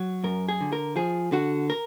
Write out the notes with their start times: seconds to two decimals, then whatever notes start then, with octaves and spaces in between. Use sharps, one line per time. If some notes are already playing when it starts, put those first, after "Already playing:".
Already playing: F#3
0.24 F#2 A#4
0.48 G#4
0.61 D3
0.73 A#4
0.96 F3 G#4
1.32 D3 F#4
1.70 A#4